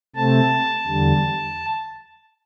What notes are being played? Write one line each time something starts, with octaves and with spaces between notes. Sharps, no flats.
C3 A3 C4 A5
E2 D3 G3